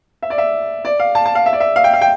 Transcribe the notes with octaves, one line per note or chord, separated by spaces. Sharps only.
E5
D5
E5
D5
F5
A5
A5
F5
E5
D5
E5
F5
G5
F5
G5